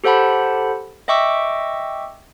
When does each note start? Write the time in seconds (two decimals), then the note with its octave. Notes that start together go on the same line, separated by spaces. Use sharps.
0.04 G4 A4 C5 F#5 A5 B5
1.08 D#5 E5 G5 C#6 D6 E6